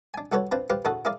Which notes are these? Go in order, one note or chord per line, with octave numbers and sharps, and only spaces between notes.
D4 G#5
C2 F#4 A4 B4 C#5
C4 D4 F4 B4 C5
F4 G4 B4 C5 F5
D2 A2 F#4 G#4 A4 F#5
E4 G#4 A#4 D5 F5